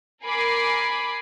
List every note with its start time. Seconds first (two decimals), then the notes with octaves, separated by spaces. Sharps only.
0.23 A#4 G#5 B5 D6 C7